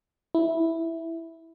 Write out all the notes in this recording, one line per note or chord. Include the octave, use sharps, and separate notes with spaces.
E4